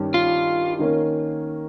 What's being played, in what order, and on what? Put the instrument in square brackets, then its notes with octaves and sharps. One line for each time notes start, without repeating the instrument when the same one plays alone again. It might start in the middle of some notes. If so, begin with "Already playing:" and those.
Already playing: [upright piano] G2 D#3 G3 C#4
[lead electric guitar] F4
[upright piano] D#3 A#3 C#4